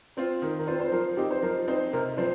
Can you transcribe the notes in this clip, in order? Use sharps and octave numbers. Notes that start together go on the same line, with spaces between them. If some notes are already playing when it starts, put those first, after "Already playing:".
C4 F4 C5
D#3 A#4
A#4
C4 F4 C5
C5
F3 A#4
C4 D#4 G4
C5
F3 A#4
C4 D#4 C5
C3 A#4
F3 C4 C5